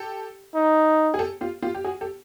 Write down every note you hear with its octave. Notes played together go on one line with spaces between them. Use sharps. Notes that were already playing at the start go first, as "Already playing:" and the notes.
Already playing: G4 A4
D#4
G#4
G4 A4
F4 G4
F4 G4
G4
F#4 G#4
G4 A4